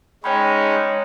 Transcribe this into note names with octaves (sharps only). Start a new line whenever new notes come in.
G#3 C#4 D#4 C#5 G5 B5